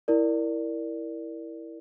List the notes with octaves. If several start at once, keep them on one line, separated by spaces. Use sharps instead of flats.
E4 A#4 D5